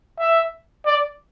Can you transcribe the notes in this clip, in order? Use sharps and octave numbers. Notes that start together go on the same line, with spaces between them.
E5
D5